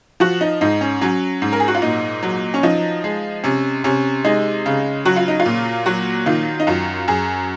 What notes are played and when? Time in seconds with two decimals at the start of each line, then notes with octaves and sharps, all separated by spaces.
0.20 F3 F#4
0.41 D#4
0.61 G#2 D#4
0.81 C#4
1.01 F#3 C#4
1.42 G#2
1.53 A#4
1.60 G#4
1.68 F#4
1.75 F4
1.82 A#2 D#4
2.23 F#3
2.54 C#4
2.63 F3 D#4
3.04 G#3
3.44 C3 C#4
3.84 C3 C#4
4.25 G#3 D#4
4.66 C#3
5.05 F#3 F#4
5.16 F4
5.28 D#4
5.40 F4
5.46 A#2
5.86 F#3 F#4
6.26 D#3 F4
6.60 D#4
6.67 F#2 F4
7.08 F#2 G#4